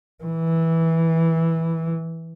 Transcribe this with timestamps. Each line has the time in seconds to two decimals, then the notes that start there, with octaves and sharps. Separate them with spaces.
0.24 E3